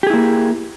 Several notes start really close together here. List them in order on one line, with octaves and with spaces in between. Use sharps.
G4 G#4 E4 A#3